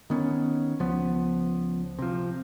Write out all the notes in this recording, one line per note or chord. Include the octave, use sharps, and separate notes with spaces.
D#3 B3 C#4
C#2 F3 B3
C3 F3